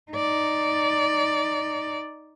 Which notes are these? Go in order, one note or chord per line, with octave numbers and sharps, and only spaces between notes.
D#4 D5